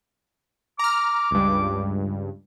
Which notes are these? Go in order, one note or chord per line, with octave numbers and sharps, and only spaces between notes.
A#5 D6 F6
C#2 G2